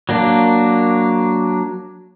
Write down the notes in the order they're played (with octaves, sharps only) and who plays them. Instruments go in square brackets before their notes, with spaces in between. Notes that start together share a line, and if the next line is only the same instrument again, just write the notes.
[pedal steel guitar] F#3 A#3 D4